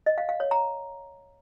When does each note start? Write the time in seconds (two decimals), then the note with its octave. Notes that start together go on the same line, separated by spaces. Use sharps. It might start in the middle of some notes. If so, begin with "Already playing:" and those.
0.06 D#5
0.18 F5
0.29 F5
0.40 C#5
0.51 A#5